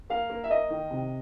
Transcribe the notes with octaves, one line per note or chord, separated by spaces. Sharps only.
A#3 F5
A#3
E5
A#3 D#5
D#3
C3